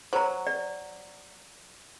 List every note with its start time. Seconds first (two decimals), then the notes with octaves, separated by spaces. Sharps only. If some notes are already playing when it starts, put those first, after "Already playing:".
0.13 F#3 C5 A#5
0.47 D5